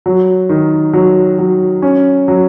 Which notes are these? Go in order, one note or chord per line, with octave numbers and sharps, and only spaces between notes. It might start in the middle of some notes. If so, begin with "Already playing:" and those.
F#3
D#3
F#3
F#3
C#4
F#3